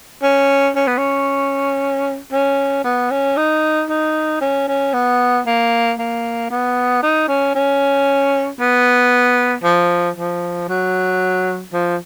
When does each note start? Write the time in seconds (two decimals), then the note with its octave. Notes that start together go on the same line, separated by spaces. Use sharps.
0.23 C#4
0.76 C#4
0.87 B3
0.97 C#4
2.32 C#4
2.84 B3
3.11 C#4
3.37 D#4
3.89 D#4
4.41 C#4
4.68 C#4
4.93 B3
5.46 A#3
5.99 A#3
6.50 B3
7.02 D#4
7.28 C#4
7.55 C#4
8.60 B3
9.63 F3
10.17 F3
10.69 F#3
11.73 F3